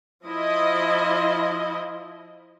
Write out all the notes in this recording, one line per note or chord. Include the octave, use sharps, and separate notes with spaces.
F3 E4 D#5